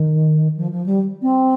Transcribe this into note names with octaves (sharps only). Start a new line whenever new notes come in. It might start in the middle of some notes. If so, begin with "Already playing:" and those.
Already playing: D#3
F3
F3
G3
C4